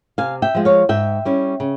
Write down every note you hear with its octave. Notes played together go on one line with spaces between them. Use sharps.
C3 F5 G#5
E5 G5
F3 G#3
C#5 F5
G#2 E5 G5
G3 C#4 E4
C#3